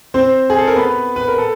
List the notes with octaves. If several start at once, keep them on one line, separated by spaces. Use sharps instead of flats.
C4 C5
G#4
A4
A#4
B3 B4
B4
A#4
A4